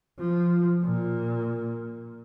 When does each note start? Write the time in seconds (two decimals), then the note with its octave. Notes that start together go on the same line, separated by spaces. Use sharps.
0.19 F3
0.83 A#2